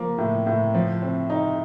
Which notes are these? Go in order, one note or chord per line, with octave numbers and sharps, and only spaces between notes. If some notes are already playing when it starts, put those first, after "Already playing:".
Already playing: F3 A#3
A2
A2
F3
C4
D#4